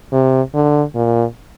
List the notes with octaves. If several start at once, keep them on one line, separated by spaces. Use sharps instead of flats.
C3
D3
A#2